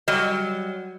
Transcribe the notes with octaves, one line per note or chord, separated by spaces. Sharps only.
F#3 G3 D#5